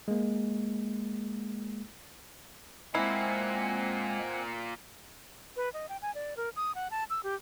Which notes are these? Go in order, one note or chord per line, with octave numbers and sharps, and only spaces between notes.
G#3 A#3
A#2 G#3 A#3 C4 E4 F#5 G#5
B4
D#5
G5
G#5
D5
A#4
D#6
F#5
A5
E6
G4